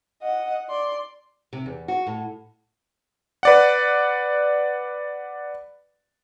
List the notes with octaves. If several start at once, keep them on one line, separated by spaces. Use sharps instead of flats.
D#5 F#5
D5 C6
C3
E2
F#4
A2
B4 D5 F#5